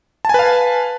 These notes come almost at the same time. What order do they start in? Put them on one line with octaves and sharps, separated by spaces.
A5 G#5 B4 F5